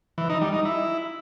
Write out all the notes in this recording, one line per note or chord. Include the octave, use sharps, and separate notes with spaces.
E3
D#4
G3
D#4
E4